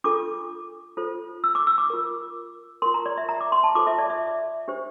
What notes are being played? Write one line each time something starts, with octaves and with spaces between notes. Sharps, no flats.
D4 F4 A4 D6
F4 A4 C5
E6
D6
E6
D6
F4 A#4
F4 A#4 C6
A#5
D5
E5
A#5
D6
C6
A5
F4 A4 C5 D6
E5
D5
E5
D4 G4 C5